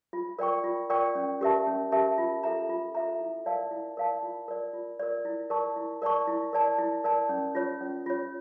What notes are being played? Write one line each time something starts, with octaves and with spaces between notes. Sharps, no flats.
F4
A#4 D5 G5 C#6
F4
A#4 D5 G5 C#6
C#4
G4 A#4 E5 A5
C#4
G4 A#4 E5 A5
F4
A4 E5 A#5
F4
A4 E5 A#5
E4
A#4 D5 F5 A5
E4
A#4 D5 F5 A5
F4
A#4 D5
F4
A#4 D5
E4
A#4 D5 A5 C#6
E4
A#4 D5 A5 C#6
E4
A#4 D5 A5
E4
A#4 D5 A5
C#4
F4 C#5
C#4
F4 C#5